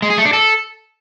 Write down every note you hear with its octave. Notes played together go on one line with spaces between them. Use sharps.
G#3
G#4
A3
D4
A4